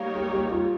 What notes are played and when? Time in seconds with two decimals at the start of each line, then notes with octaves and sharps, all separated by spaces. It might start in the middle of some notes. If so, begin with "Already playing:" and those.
Already playing: G3 A#3 D#4 A#4 C#5 F5
0.15 G4
0.33 G4
0.48 G4
0.51 F4